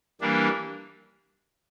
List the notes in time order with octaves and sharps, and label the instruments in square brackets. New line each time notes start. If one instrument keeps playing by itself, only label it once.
[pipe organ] E3 G3 A#3 D4